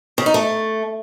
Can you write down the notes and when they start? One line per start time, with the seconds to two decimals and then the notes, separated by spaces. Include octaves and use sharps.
0.18 C#3
0.26 D#4
0.34 A3